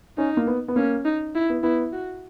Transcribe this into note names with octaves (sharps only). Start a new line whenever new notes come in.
C#4 D#4
A#3
B3
B3
A#3 C#4
D#4
E4
B3
B3 E4
F#4